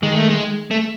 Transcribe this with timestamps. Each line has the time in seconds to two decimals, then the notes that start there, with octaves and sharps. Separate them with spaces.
0.03 D#3 G#3
0.16 A3
0.30 G#3
0.71 A3